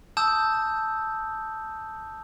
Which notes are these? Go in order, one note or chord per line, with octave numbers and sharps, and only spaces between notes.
A5 D#6 E6 G6